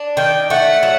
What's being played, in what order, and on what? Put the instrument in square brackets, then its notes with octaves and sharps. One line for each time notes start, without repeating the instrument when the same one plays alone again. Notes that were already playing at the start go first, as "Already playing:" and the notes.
Already playing: [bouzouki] D4
[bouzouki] D#3 [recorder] G5
[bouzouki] A3 [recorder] F#5
[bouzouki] F#3